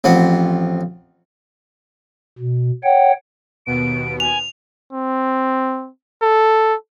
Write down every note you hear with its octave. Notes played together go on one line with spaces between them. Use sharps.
A1 F3 C4 F#5
B2
C#5 F#5 G5
D#2 B2 B3 D7
G#5 F7
C4
A4